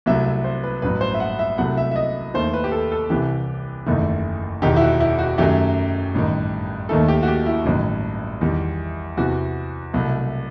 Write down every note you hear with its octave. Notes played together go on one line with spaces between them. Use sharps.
C2 C3 F#3 A3 E5
E5
C5
B4
A1 G2 F#3 B4
C5
E5
F#5
E5
C2 C3 F#3 A3 F#5
E5
E5
D#5
D#2 D#3 A3 C5
B4
G4
A4
A4
C2 C3 E3 G4
F#1 E2 D#3 A3
E1 E2 D#3 G4
E4
F#4
E4
F#4
F#2 D#3 F#3 A3 G4
A1 G2 D#3
D#2 D#3 A3 A4
G4
F#4
G4
E4
A1 G2 D#3 F#3
E2 D#3 G3
E2 C3 E3 F#4
C2 B2 F#3 A3